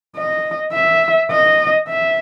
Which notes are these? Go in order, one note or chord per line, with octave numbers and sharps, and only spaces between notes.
D#5
E5
D#5
E5